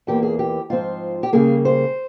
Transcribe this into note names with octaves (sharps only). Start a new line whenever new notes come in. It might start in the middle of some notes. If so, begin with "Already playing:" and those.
E2 E3 A#3 F4 G4
G#4
G4
G#2 F3 C4 F4
G4
C#3 G3 A#3 G#4
C5